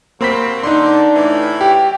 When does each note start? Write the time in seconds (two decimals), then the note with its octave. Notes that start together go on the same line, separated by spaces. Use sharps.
0.21 C3 F#3 A#3 C4 B5 B6
0.63 D3 D4 D#4 C6
1.15 A2 E3
1.61 G4 G5